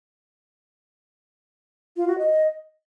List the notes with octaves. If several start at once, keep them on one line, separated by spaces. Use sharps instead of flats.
F4
F#4
D#5